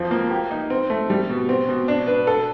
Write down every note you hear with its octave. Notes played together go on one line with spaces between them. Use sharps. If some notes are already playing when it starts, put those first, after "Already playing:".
Already playing: F2 F3
A#3
G4
D#4
C4
A3
G3
B2
C4
B2
D4
B4
A4